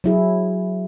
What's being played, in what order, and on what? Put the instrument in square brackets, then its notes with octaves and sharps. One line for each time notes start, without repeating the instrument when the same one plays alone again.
[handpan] F#3 E4 G#4